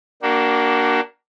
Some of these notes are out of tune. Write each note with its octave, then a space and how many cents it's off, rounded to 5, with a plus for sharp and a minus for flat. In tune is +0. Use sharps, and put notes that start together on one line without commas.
A#3 +5 D4 +0 F#4 +30